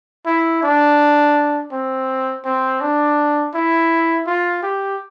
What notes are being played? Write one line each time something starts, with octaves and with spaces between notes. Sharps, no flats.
E4
D4
C4
C4
D4
E4
F4
G4